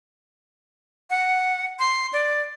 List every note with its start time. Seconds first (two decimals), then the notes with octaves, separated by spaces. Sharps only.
1.10 F#5
1.79 C6
2.13 D5